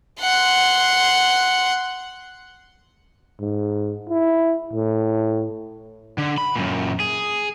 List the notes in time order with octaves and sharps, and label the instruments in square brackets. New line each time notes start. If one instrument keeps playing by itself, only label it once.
[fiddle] F#5 C6
[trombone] G#2
E4
A2
[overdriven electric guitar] D3
B5
F#2 A#2
G#4